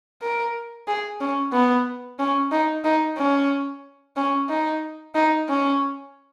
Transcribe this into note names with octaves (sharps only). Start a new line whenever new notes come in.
A#4
G#4
C#4
B3
C#4
D#4
D#4
C#4
C#4
D#4
D#4
C#4